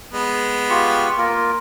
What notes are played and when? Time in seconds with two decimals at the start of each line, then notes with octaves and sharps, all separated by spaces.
0.13 G#3 B3
0.70 F4 G4 C#6
1.18 A#3 F4 A#4